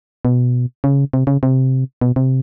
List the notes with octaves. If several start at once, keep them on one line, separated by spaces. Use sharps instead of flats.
B2
C#3
C3
C#3
C3
B2
C3